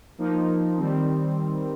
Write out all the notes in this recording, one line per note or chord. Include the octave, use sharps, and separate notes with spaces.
F3 A#3 D#4
D#3 G3 C4